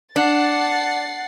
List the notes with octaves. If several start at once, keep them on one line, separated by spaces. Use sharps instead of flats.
D4 F#5 A6 C7